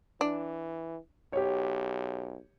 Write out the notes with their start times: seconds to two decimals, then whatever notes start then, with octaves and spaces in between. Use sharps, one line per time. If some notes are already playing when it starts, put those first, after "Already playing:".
0.21 E3 D4
1.33 B1 G4 C#5